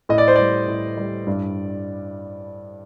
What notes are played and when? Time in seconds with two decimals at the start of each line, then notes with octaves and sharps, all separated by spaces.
0.09 A2 D#5
0.18 D5
0.28 C5
0.36 G3 D5
0.68 A2
0.97 G3
1.27 G2